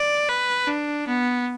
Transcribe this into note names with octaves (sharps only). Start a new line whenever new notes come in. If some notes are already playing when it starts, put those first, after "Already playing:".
Already playing: D5
B4
D4
B3